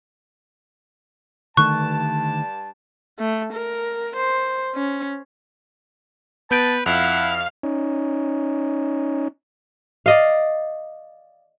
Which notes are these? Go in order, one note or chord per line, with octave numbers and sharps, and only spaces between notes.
G2 D3 D#3 A3 A5 C#6 F#6
A3
A#4
C5
C#4
B3 B4 A5 G6 D7
F2 E4 F5 F#5 F6
C#4 D#4
D5 D#5 F5